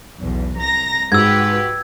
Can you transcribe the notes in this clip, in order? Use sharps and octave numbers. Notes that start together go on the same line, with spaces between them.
B1 E2
C2 A#5 A#6
G#2 F#4 G4 B4 E6 G#6